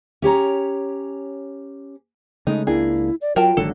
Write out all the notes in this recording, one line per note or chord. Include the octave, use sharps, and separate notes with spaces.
C#4 G4 C#5 A#5
C#3 G#3 A3 D#4
C#2 A#3 D4 E4 G#4
D5
F#3 F4 A#4 G5 A5
G#1 D3 F#3 A4